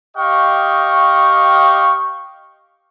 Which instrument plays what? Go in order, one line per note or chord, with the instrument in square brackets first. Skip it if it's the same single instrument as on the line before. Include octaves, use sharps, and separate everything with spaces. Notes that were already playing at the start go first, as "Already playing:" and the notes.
[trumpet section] G4 D#5 F5 G5 C#6